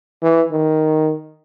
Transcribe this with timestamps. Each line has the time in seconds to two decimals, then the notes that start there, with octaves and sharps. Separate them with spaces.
0.22 E3
0.51 D#3